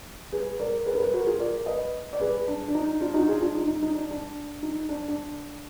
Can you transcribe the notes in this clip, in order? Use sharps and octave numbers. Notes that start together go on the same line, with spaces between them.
G#4 B4
A#4 D5
G#4 B4
A#4
G#4 B4
F#4 A#4
F4 G#4
A#4 D5
B4 D#5
D5
G#4 B4
D4
D4
D#4
D4 F4
D#4 F#4
F4 G#4
D4 F4
D#4
D#4
D#4
D4
D4
D#4
D4
D4